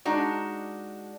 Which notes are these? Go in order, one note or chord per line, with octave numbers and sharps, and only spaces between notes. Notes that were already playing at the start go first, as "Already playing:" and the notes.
G#3 D4 D#4 F#4